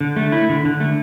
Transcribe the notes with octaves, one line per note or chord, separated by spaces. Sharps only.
D3
A3
E4
D3
D3
A3